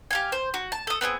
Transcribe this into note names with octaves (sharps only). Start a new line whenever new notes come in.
G4 F5 G#5
C5
F#4
A5
A4 D#6
B3 C4 D4 G#4